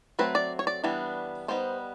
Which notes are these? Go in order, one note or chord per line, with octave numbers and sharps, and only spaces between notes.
F#3 A3 C4 B4
D5
C#5
D5
E3 G3 B3 D4
G3 B3 D#4 C5